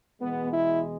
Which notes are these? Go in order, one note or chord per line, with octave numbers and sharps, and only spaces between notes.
E2 B2 G#3 B3
E4